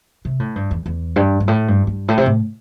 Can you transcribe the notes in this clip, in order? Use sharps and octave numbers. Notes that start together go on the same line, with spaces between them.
C3
A2
G2
E2
E2
G2
G2
A2
G2
G2
A2
C3
A2